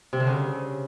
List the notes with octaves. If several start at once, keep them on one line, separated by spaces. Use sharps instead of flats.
C3
D3
C#3